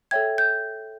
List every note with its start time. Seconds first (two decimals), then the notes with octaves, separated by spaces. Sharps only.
0.11 A4 C#5 E5 G5 G#6
0.38 G6